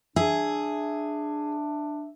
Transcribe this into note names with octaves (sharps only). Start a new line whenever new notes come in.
D4 G#4 E5